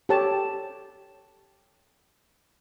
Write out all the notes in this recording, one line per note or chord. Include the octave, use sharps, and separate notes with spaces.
G4 A4 C#5 A5